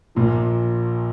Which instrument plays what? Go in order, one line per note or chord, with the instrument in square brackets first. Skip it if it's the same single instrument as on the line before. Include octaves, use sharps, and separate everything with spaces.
[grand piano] A#1 A#2 F3